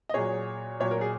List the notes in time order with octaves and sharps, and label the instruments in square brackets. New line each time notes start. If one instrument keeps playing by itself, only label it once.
[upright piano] D#5
A#2 F#3 G#4 C#5
A#2 F#3 C#5
A#4
G#4